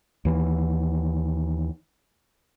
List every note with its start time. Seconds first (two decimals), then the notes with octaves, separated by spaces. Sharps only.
0.25 D#2 E3